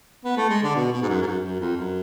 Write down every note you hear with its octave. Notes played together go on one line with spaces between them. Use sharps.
B3
A3
G#3
D3
B2
B2
G#2
F#2
G#2
F#2
F#2
F2
F#2